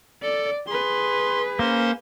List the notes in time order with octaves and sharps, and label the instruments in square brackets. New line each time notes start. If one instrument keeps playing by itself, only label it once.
[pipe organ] A4 [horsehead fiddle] D5
[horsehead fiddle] G#4 B4 [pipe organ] C6
[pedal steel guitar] A#3 [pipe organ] C#4 C5 C6